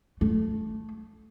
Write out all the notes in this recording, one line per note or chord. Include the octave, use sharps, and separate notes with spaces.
A3